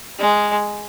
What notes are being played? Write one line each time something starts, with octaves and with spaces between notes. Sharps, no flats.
G#3